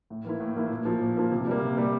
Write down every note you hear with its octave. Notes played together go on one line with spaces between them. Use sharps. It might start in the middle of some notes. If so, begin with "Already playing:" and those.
A2
E3 A#3 E4
A2
E3 A#3 E4
A#2
F3 A#3
A#2
F3 A#3
C3
G3 A#3
C3
G3 A#3